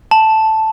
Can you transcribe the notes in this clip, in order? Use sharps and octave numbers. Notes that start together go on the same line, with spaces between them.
A5